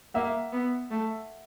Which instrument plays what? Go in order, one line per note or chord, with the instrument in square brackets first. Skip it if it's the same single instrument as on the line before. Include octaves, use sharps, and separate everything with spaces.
[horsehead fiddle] A#3 [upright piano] E5 F#5
[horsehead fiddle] B3
A3